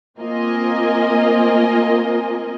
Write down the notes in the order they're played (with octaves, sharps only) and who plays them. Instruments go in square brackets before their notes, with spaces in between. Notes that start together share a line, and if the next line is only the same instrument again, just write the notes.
[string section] A#3 C4 F4 A#4 D#5 G#5